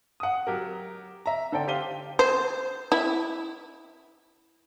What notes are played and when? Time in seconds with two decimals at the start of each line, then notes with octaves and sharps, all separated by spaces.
0.20 F#5 D#6
0.47 F#3 G4 A#4
1.26 E5 A#5
1.52 D3 A4 C5 D5 G5
1.68 G4 C5 F5 D#7 G7
2.19 C5
2.92 E4